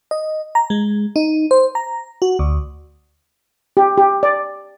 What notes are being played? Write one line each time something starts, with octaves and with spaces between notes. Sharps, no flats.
D#5
A#5
G#3
D#4
C5
A#5
F#4
D2
G4
G4
D5